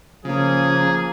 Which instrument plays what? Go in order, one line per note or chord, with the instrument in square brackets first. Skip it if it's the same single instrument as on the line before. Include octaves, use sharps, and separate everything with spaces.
[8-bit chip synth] C#3 C#4 [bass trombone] F3 [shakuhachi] A#3 [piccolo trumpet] G#4